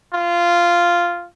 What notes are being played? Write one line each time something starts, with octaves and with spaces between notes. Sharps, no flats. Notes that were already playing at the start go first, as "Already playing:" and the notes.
F4